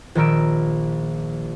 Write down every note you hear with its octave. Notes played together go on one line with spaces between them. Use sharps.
A#1 D#3 D#4 A#4 E6 D7